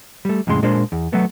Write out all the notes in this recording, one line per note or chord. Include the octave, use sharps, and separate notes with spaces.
G3 A3
F2 A2 C#3 G#3 C6
A#2 G#3 A#3 D4 C5
E2
F#3 A3 B3